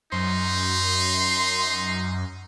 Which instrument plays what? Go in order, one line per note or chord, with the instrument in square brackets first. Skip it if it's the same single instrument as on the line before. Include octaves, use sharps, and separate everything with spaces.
[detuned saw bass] F#2 [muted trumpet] D#4 [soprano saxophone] C6